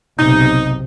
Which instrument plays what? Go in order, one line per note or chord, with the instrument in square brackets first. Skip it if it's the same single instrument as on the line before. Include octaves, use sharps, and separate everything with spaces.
[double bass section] F#1 B1 C3 [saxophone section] D#4